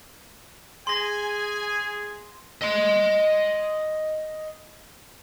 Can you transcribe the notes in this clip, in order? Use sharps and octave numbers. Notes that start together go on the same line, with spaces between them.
G#4 G#5 C6 A#6
D#5 C6